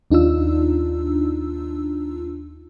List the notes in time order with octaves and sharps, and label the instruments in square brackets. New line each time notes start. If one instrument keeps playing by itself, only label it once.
[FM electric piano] D#2 D4 D#4 F4 E6